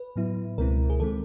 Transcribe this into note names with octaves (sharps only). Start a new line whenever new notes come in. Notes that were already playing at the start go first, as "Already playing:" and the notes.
Already playing: B4
A2 F#3 B3 E4
C#2 B2 G#3 C4 E4 A#4
G#4
D#3 G#3 C4 A4